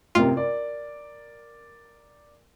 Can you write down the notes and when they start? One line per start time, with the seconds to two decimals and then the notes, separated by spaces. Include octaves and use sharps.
0.15 A1 C3 F4 A#4
0.36 A#4 D5